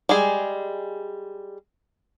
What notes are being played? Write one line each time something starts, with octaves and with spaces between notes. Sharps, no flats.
G3 G#3 G#4